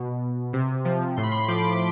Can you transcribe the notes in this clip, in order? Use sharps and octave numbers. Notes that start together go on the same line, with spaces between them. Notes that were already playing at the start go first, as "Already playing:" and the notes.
Already playing: B2
C3
F3
A2 C6
B5
C6
F3 D6